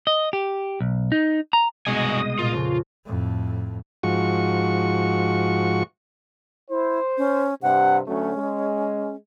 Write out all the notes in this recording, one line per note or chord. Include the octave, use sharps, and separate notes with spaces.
D#5
G4
B1
D#4
A#5
C2 G2 B2 G#3 F#4 D#5 G#5 D#6
A#2 F4
F2 C#3
F2 A2
G#2 F3 F#4 C#6
E4 C5
C#4
G2 C3 F#5
D2 F#3 A3 C#4
G#3